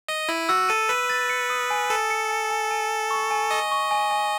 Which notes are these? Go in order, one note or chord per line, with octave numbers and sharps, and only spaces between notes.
D#5 D#7
E4 F#7
F#4 E6
A4 D#7
B4 D#7
A6
C#7
D#6
G#5
A4 G#5
C#7
G#5
G#5
G#5
G#5
C#6
G#5
D#5 C#6
C#6
G#5
G#5